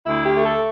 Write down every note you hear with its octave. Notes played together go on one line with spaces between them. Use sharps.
D2 E4
G4
A3
A4